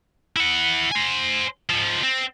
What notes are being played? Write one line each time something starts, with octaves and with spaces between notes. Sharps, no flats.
E4 F#5
C5 G#5
G#2 F3
C4